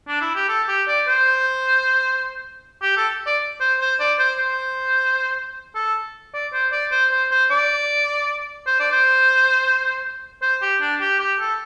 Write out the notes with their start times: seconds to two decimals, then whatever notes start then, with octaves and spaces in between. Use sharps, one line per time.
0.08 D4
0.21 E4
0.35 G4
0.49 A4
0.68 G4
0.88 D5
1.08 C5
2.82 G4
2.97 A4
3.27 D5
3.61 C5
3.80 C5
4.00 D5
4.19 C5
4.39 C5
5.75 A4
6.34 D5
6.53 C5
6.72 D5
6.91 C5
7.11 C5
7.31 C5
7.50 D5
8.67 C5
8.80 D5
8.92 C5
10.42 C5
10.62 G4
10.81 D4
11.01 G4
11.20 G4
11.40 A4